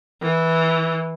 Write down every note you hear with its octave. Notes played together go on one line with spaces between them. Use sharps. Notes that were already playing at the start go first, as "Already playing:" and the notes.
E3